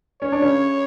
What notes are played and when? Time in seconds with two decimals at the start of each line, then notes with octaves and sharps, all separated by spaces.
0.22 C#4 C#5
0.32 D4
0.42 C#3 C#4